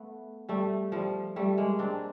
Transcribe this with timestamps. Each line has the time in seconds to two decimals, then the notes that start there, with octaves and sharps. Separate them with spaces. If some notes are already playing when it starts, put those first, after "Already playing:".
Already playing: A3 B3
0.49 G3 A3
0.92 F3 G3
1.36 G3 A3
1.58 G#3 A#3
1.79 C4 D4